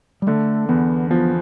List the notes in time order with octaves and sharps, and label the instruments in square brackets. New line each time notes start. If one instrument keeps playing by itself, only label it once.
[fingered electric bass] G3
[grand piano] D3 [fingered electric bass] A3
[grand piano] E2 [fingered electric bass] B3
[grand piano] F3 [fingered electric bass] B3